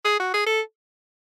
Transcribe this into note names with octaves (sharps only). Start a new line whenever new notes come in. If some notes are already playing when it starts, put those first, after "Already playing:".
G#4
F#4
G#4
A4